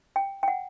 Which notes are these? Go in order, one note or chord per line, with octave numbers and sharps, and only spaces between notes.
G5
G5
F#5